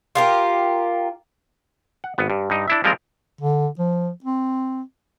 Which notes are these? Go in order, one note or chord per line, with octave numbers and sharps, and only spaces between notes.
F4 G4 A#4
F#5
G#1 B3
G2
G2 D#4
D4 E4 E5
F3 G3 G#3 C4 F4 A#4
D3
F3
C4